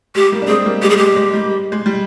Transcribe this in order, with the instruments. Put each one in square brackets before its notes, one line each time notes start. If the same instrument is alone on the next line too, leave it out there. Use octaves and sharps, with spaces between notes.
[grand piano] G#3 [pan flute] G4
[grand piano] G3 A#3
D4
[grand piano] G#3 C4 [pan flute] G#4
[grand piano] G3 A#3
[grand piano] G#3 [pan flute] G4
[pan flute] G#4
[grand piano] G#3 [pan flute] G4
[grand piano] G#3
G3
G#3
G3